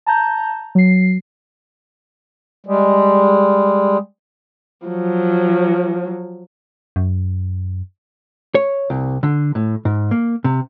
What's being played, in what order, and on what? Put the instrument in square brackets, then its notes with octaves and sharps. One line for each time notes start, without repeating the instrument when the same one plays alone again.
[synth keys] A5 A#5 G6
F#3 C7
[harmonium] G3 G#3
[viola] F3 F#3
[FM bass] F#2
[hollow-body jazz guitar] C#5
C2
D3
A2
G#2
A#3
C3